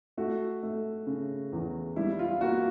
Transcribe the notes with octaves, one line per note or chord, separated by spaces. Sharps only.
A3 F#4
A3
C#3
E2
G3 E4
F4
A#3 F#4